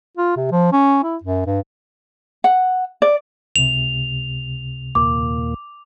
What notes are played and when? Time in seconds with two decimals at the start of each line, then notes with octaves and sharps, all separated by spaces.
0.17 F4
0.37 C3
0.51 F3
0.73 C#4
1.04 E4
1.24 F#2
1.46 G2
2.44 F#5
3.02 D5
3.56 C#2 C3 F7
4.95 D#2 A#2 A#3 D6